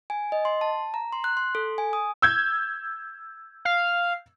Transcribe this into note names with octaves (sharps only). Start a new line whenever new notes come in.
G#5
D#5
C6
A5
A#5
C6
F#6
C6
A4
G#5
D#6
E6 G6 G#6
F5